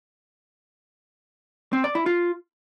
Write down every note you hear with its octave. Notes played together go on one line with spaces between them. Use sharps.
C4
D5
E4
F4